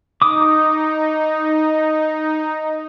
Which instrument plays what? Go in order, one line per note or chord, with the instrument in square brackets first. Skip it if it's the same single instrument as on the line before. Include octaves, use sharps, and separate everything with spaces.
[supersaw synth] D#4 [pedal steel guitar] D6 D#6